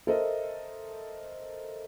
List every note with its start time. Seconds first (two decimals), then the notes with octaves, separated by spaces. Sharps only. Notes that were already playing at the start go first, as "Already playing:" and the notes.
0.07 A4 A#4 C5 D#5 E5